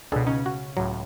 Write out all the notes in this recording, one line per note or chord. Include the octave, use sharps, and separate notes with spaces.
C#2 B2 D4 G#4 A4
C#3 C#4 D#4
F#4
C#2 A2 F#3